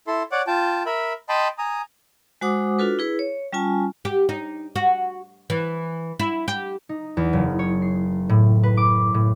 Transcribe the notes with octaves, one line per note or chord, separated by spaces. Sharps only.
E4 A4 C6
C#5 D5 F#5 D6
F4 G5 A5
A#4 E5 B5
D#5 G5 A5 B5 C6
G#5 A#5 D#6
G#3 F#4 C5 F#5 D6 D#6
D4 F4 F#4 A4 B4
E4 G#4 B4
C#5
G3 C#4 F4 G#5 A5
G4
D#4
F#4
E3
E4
G4
D#4
E2
F#1
C#5
C7
A2
B4
D6
A2